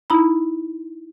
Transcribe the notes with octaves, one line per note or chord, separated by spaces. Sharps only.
D#4 E4 A#5 B5